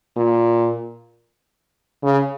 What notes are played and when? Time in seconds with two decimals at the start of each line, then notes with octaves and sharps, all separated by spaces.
0.17 A#2
2.03 C#3